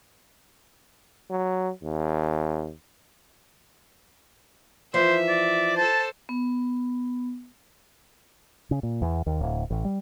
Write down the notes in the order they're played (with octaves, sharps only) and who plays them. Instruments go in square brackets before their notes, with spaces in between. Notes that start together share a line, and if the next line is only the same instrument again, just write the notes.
[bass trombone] F#3
D#2
[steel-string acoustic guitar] E3 F3 [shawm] C5 [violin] E5
[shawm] D5
[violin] A4 C5 [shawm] A5
[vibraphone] B3
[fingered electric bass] C#3
A#2
E2
D#2
D1
A1
G3